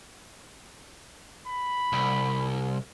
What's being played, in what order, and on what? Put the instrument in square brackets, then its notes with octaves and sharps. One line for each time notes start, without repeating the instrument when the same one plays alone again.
[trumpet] B5
[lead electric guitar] C2